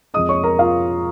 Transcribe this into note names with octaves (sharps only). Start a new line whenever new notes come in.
F2 F3 G#3 D#5 D#6
C#5 C#6
A#4 A#5
F4 F5